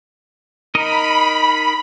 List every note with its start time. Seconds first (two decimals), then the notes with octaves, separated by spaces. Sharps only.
0.75 D#4 A#4 D#5 B5